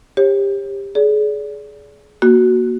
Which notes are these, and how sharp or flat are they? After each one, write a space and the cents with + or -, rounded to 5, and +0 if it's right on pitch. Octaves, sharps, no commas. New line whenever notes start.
G4 +20 C#5 -40
G#4 +30 D5 -30
A#3 +20 F#4 +0